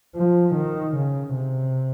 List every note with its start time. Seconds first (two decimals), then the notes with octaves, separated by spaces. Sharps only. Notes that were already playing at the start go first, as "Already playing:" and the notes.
0.15 F3
0.55 D#3
0.95 C#3
1.35 C3